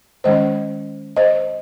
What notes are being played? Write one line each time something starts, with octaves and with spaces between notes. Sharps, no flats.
D#3 G#3 C#4 C5 D#5
C5 D#5